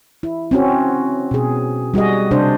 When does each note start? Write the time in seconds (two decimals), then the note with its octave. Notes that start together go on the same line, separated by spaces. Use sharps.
0.23 E4
0.51 C4 C#4 F#4
1.31 B2 G#4
1.94 G3 F#4 G#4 D#5
2.31 C3 D4 C5